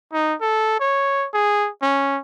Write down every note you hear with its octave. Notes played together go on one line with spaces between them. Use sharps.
D#4
A4
C#5
G#4
C#4